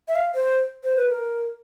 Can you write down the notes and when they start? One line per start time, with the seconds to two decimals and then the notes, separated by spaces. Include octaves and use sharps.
0.08 E5
0.15 F5
0.35 C5
0.84 C5
0.96 B4
1.09 A#4